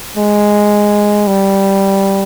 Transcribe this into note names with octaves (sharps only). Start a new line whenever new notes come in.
G#3
G3